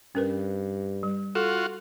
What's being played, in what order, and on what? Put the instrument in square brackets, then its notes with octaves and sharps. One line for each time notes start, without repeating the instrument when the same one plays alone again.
[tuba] G2 [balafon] C#4 A#4 B4
[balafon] G3
[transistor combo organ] F4 F#4 [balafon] A4